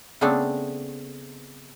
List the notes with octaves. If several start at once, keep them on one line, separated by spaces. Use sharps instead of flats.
C#3 A3 B3 C4 D4 A4